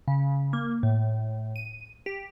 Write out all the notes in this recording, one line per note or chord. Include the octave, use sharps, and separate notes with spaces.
C#3
A#3
A2
D#7
G4